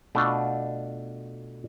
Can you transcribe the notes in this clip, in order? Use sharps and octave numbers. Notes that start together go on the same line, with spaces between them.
B2 A3 D4 F4